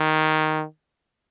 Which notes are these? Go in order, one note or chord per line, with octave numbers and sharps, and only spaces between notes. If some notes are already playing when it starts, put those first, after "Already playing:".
Already playing: D#3